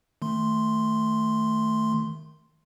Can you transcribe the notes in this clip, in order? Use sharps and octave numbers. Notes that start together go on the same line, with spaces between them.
D#3 A3 C6